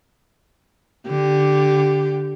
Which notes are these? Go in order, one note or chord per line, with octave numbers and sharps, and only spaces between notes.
D3 G4